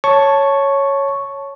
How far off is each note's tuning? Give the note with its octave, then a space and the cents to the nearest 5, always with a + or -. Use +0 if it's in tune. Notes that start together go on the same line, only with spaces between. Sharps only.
C#5 +0 A5 +0 C#6 +0